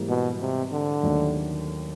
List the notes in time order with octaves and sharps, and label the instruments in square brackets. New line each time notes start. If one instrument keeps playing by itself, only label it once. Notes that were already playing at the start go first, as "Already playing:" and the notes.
Already playing: [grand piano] G#2 E3 G3 A#3
[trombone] B2
C3
D3
[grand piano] D#2 D#3 F#3 A3 D4